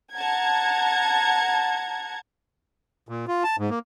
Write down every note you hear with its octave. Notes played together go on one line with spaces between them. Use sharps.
F#5 A5 A#5 G#6
A#2
F4
A5
G#2
A#3